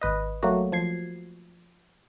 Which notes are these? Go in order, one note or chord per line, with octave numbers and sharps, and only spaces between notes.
G#1 B4 D#5
F#3 A3 A#3 F#4
F3 G#6 C7